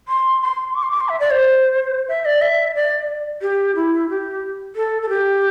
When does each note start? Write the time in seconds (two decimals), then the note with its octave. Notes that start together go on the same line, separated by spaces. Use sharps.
0.08 C6
0.42 C6
0.75 D6
0.83 C6
0.91 D6
1.00 C6
1.09 E5
1.20 D5
1.31 C5
2.09 E5
2.25 D5
2.41 E5
2.75 D5
3.42 G4
3.76 E4
4.09 G4
4.76 A4
5.02 A4
5.09 G4